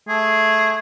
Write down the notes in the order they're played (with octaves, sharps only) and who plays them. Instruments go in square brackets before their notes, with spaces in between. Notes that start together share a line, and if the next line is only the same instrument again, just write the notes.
[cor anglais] A3 [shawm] G#4